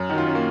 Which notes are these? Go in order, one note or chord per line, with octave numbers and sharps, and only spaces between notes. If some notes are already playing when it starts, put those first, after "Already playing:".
Already playing: F#2
D#3 F#3 D#4 F4
C#4
A#3